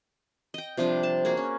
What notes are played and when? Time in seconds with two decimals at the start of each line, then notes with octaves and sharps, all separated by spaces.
0.54 D#5 G5
0.77 C3 F3 G3 D4
1.03 A5
1.25 A#3 F#4 G#4
1.37 C#4